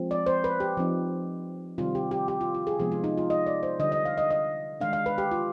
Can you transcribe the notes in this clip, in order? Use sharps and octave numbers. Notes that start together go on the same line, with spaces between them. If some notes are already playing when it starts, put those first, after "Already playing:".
Already playing: F3 G#3 C4
D5
C5
B4
G4
F3 C4 D#4
C3 D#3 G3 C4 F4
G4
G4
G4
F4
F4
G#4
C3 F3 G#3 B3 D#4 G#4
F4
D#4
F4
D#5
D5
C5
D3 G3 D4 D#5
D#5
F5
D#5
D#5
D#3 G#3 D4 F5
F5
B4
G4
F4